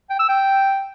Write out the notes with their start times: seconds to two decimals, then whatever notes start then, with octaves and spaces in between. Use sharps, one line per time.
0.10 G5
0.19 E6
0.29 G5